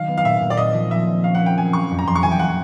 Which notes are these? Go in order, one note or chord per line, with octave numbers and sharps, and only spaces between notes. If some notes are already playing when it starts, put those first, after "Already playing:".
Already playing: D#3 F#3 F5
B3
F5
A#2 E5
A#2
D5
C4 D#5
F3
C4 E5
C4
C#4 F5
F#5
A#3
G5
F#3 G#5
F#3 C#6
F2
A#5
F2 C6
C#6
E3 G#5
G5
F#5